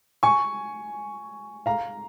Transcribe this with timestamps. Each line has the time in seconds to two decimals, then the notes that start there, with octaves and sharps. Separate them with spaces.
0.23 G#5 C#6
1.66 F5 A#5